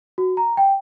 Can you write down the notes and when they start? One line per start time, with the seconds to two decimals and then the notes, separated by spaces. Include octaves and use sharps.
0.18 F#4
0.37 A#5
0.57 G5